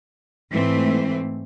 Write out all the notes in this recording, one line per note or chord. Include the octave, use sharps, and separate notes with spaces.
G#2 E3 A3 C4